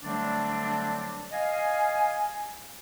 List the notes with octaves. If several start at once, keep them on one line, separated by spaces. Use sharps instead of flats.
D3 F#3 G3 A3 C4 D4
D#5 F5 G#5